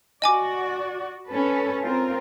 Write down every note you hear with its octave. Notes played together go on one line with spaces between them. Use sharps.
F#4 D5 D#5 G#5 D6
C#4 A4 B4
C4 F4 A#4